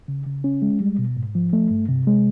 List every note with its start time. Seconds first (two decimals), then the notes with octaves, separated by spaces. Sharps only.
0.08 C#3
0.26 C#3
0.44 C#4
0.62 G#3
0.80 G3
0.99 B2
1.17 G#2
1.35 F3
1.53 A3
1.70 G2
1.89 C3
2.07 G#3